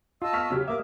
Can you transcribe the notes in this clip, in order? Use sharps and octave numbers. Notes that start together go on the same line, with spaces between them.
F4 D#5 A5 E6
C#6 F6 B6
C#3 F#3 G4
A#3 E5 D6 D#6